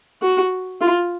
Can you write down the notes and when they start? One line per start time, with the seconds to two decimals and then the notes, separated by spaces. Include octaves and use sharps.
0.22 F#4
0.81 F4